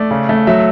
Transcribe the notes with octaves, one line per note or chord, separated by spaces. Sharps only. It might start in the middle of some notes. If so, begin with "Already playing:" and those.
Already playing: A3 D5
C#3
A3
F#3 E5